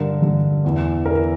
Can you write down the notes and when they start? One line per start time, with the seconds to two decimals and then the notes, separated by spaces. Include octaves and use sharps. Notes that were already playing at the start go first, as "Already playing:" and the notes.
Already playing: G2 D3 A#4
0.22 G2 D3
0.64 E2 E3
1.05 E2 A#4
1.10 E3